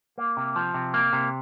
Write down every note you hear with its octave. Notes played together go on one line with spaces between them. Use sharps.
A#3
C3
F3
C3
A#3
C3